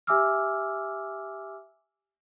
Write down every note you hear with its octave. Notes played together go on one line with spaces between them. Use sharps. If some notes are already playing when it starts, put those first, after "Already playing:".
G4 E5 G#5 D6 E6 F6